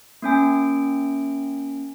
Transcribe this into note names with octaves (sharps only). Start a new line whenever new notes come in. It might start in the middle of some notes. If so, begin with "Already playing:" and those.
A#3 C#4 G#5